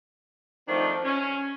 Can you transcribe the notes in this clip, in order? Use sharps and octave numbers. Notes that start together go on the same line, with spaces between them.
D#3 F3 A3 C4 D4 F4
C#4